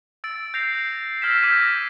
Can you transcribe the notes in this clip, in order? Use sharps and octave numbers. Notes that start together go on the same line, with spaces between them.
E6 A6 D7
G6 A#6 C7 F7
A#6
E6 F6 G#6 A6 B6 E7
D6 E6 G6 A#6 B6 D#7